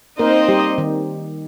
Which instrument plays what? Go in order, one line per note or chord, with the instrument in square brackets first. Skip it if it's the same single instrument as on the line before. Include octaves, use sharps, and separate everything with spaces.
[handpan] A#3 A#4 [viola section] C4 D#4 C5 D#5
[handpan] G3 G4
D#3 D#4